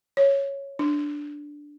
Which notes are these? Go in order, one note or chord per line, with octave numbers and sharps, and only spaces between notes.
C#5
D4